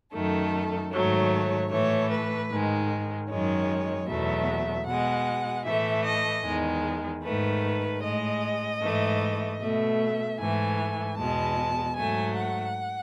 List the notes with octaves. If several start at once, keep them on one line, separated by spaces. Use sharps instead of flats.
F#2 D#3 A3 A4
G#2 D#3 F#3 A3 C#5
A2 E3 A3 C#5
B4
G#2 D#3 G#3
F#2 D#3 G#3 C#5
E2 B2 F#3 A3 E5
B2 G#3 F#5
A2 E3 A3 E5
D#5
E2 D#3 G#3
G#2 D#3 A3 B4
A2 G#3 D#5
G#2 E3 A3
B2 A3 E5
G#2 E3 A3 G#5
E2 B2 G#3 A5
G#2 F#3 A3 G#5
F#5